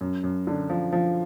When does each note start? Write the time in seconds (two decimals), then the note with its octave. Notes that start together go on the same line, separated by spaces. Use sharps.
0.01 F#2
0.24 F#2
0.47 D3
0.70 F3
0.93 F3